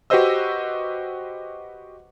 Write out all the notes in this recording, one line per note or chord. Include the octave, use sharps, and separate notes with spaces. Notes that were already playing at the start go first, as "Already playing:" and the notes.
F#4 G4 B4 C5 D#5 E6